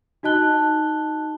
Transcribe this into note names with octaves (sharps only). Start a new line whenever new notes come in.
D#4 F#4 D#5 A5 F#6 G7